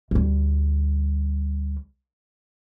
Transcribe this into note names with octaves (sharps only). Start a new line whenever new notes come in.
D2 G3